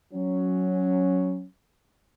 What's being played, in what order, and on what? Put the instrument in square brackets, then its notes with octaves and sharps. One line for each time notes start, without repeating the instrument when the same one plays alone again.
[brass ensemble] F#3 C#4